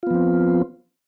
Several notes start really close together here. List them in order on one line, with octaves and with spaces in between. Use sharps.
F4 B3 F3 C4